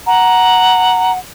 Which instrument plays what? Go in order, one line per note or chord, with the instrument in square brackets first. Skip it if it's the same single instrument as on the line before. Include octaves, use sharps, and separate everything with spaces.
[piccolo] F#5 [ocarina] A#5